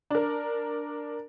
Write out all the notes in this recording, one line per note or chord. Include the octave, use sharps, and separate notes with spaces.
D4 A#4